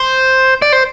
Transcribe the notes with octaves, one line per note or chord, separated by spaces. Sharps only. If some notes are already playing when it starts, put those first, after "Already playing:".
Already playing: C5
D5
C5